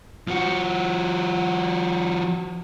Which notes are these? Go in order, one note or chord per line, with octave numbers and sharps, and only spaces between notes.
F3 F#4